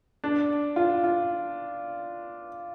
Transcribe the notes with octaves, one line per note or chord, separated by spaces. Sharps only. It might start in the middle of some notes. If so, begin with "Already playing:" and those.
D4
F4
F4